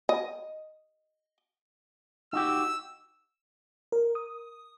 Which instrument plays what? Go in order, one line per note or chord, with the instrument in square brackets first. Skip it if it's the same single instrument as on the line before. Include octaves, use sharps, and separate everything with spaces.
[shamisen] D#5
[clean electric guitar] D#4 F#4 G4 [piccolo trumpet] E6
[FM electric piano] A#4
D#6